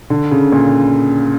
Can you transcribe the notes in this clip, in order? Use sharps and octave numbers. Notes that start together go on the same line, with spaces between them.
D3
C#3
A#2